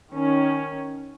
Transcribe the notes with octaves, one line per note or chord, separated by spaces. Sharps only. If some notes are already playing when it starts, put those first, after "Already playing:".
D#3 C#4